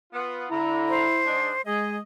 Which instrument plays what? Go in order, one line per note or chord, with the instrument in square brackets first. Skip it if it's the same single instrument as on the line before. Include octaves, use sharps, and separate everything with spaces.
[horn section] B3 F4
[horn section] D3 A#5 [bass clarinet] E4
[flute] C5
[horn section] G#2 D4 D#5
[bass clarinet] G#3 [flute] G#4 [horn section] D#5